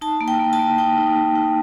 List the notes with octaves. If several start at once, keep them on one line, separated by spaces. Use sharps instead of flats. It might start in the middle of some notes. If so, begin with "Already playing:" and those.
D#4 A5
A#3
G5
A#3
A5
A#3
D#4 G5
D#4
D#4
D#4